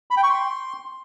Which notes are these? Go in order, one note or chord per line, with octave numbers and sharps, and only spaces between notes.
B5
G5
C#6
C6